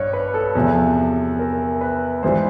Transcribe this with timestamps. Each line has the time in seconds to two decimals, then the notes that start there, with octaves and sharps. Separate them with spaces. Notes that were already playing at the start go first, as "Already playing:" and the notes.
Already playing: G2 C#5
0.13 B4
0.34 A4
0.55 E2 C3 F3
1.39 A#4
1.81 B4
2.23 G#2 E3 G3 C5